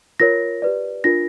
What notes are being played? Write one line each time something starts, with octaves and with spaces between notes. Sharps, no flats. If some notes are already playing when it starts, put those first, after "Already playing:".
F4 A#4 C#5 A#6
G4 B4 D5
D4 F4 A#4 A#6